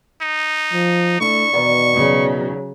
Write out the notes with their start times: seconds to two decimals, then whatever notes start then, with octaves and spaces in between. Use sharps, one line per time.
0.22 D#4
0.73 F3
1.21 A3 D4 E4 C#6
1.53 E2 B2 D#3 D5
1.95 C#3 F#3